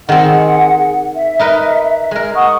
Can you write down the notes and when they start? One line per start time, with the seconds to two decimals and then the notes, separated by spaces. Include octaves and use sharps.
0.09 D#3 C4 G#4 F#5
1.15 E5
1.39 D#4 A#4 B4
2.11 G#3 A#4
2.35 F#5 C#6 D#6